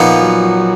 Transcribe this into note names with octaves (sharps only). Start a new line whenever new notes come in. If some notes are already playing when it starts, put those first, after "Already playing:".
Already playing: A#2 F3 B3 D#4
F#3